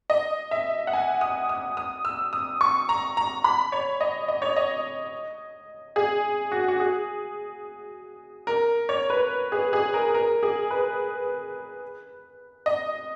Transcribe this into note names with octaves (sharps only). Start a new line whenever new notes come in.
D#5
E5
F#5
G#5
D#6
D#6
D#6
E6
D#6
C#6
A#5
A#5
B5
C#5
D#5
D#5
C#5
D#5
G#4
F#4
F#4
G#4
A#4
C#5
B4
G#4
G#4
A#4
A#4
G#4
B4
D#5